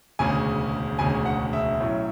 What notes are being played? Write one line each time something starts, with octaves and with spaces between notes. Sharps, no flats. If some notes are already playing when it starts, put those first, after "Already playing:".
E1 D2 C#3 G#5
E1 D2 C#3 G#5
F#5
E5
B1 A2 F#3 C#4